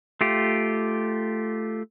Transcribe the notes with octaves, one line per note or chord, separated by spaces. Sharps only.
A3 F4 G4